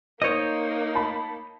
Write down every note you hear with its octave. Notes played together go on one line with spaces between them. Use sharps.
A#3 D#4 C5 C#5 D#5 G6
A5 B5